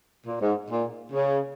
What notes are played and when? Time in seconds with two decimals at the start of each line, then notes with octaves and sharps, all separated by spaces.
0.27 A#2
0.41 G#2
0.70 A#2
1.13 C#3